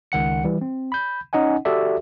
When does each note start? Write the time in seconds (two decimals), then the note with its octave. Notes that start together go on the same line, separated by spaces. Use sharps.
0.12 C#2 D#3 F#5 C#7
0.44 E3 G3
0.61 C4
0.92 B5 G6
1.33 C#4 D#4 D#5 F#5 G#5
1.65 F#4 G4 A4 D5 E5